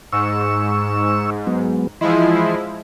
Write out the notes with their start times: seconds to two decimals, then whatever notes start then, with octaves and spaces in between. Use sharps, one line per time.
0.12 G#2 C#6 E6
1.47 F#3 G#3 B3
2.01 E3 F3 G#3 E4 D#5 C6